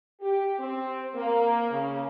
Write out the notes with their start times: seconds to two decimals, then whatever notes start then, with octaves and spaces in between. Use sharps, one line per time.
0.21 G4
0.59 C4
1.15 A#3
1.71 C#3